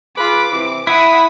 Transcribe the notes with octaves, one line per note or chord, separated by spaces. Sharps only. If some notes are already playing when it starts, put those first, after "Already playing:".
F4 G#4 B4 D6
C3 E3
E4 E5 F#5 B5 D#6